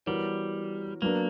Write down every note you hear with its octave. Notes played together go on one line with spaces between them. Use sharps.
E3 G3 B3 F#4 A#4 C#5
F#3 A#3 B3 D4 A#4